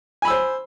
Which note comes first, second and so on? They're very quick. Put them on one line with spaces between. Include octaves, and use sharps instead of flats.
G#5 B5 E6 C5